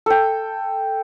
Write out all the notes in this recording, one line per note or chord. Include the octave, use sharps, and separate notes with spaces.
A4 G5